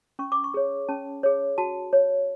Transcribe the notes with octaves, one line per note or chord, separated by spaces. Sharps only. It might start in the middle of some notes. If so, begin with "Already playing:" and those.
C#4 C#6
D6
C#6
G#4 C#5
C#4 A5
G#4 C#5
F#4 A5
C#5